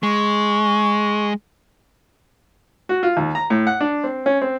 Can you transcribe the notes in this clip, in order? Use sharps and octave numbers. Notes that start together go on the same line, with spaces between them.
G#3 C#6
F#4
F4
D#2
A#5
A2
F#5
D4
C4
C#4
C4